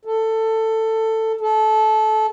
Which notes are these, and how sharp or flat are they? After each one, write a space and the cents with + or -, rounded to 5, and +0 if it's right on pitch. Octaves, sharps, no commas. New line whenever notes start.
A4 +15
A4 -20